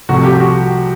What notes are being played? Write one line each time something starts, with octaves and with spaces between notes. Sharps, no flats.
C2 C3 F3 A3 F#4
G4
F#4